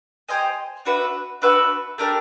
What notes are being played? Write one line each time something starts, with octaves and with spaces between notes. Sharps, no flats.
G4 C5 D#5 G#5
D4 F#4 B4 E5
D4 F#4 B4 E5
A3 D4 G4 A#4